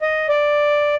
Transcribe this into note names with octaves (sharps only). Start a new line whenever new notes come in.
D#5
D5